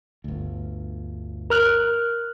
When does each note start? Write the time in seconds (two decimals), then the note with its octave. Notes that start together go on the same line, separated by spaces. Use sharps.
0.24 G1 D2
1.50 A#4 F6 F#6